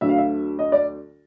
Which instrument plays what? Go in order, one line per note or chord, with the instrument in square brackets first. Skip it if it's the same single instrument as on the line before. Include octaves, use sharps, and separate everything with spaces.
[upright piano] D2 D3 F#3 E5
F5
E5
D#5
D5